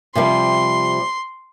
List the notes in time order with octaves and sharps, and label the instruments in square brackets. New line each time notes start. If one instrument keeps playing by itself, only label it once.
[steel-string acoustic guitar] C3 F3 G3 [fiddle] C6